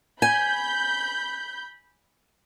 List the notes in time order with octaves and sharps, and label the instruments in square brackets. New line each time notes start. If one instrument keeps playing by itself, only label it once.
[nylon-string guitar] G#5 [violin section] B5 G6